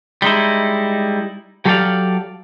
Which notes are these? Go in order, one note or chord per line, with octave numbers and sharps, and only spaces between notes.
G3 G#3 D#4 E4
F#3 G4 A4 C5 D5 F5